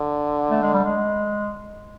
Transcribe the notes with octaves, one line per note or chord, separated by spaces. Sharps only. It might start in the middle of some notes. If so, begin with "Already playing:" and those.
Already playing: D3
A3
G#3
G3
G#3